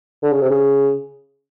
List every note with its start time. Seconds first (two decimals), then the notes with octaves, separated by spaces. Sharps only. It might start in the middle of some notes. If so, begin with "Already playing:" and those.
0.23 D3
0.32 C#3
0.41 C3
0.50 C#3